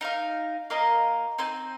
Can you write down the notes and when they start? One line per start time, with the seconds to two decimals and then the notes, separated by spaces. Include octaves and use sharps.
0.01 D#4 A#4 F5
0.70 A#3 F4 A#4 D#5
1.38 C4 D#4 C5 G#5